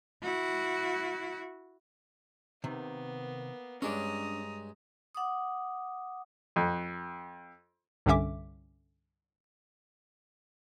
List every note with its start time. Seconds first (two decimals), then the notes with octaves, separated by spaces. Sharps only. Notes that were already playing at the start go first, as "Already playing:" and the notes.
0.23 E4 F#4
2.64 C3 D#3 A#3 B3
3.82 G2 G#3 C#4 D4 C#5 D5 A#5 D#6
5.15 F#5 D6 D#6
6.56 F2
8.06 C2 G2 D3 C#4 E5 D6